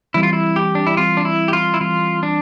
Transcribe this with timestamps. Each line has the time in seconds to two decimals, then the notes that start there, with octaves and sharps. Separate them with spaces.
0.14 E3 G3 C4 E4
0.23 F4
0.33 E4
0.56 G4
0.75 D4
0.87 E4
0.97 E3 G3 C4 F4
1.17 D4
1.25 E4
1.48 G4
1.53 F4
1.74 E4
1.81 E3 G3 C4 F4
2.23 D4